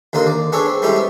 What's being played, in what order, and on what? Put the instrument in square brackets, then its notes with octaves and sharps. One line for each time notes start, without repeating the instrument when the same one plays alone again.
[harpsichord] D#2 D3 A#3 D#5 C6
D5
B3 D4 G#4 A4 C#5 D5
C4
G3 G#3 C#4 E4 G4 A4
B3